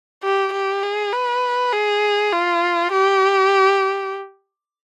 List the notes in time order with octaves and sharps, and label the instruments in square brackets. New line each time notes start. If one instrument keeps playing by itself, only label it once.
[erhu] G4
G4
G#4
B4
G#4
F4
G4